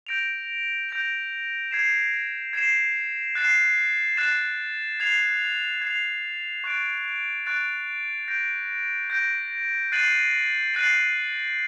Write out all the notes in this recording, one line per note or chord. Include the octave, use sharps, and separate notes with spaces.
G6 A#6 D7 F7
G6 A#6 D7 F7
G#6 C7 E7
G#6 C7 E7
F#6 A6 C7 E7
F#6 A6 C7 E7
G#6 C7 F7
G#6 C7 F7
C#6 F#6 A6 D7
C#6 F#6 A6 D7
G6 A#6 D7
G6 A#6 D7
F#6 A6 C7 D#7 F#7
F#6 A6 C7 D#7 F#7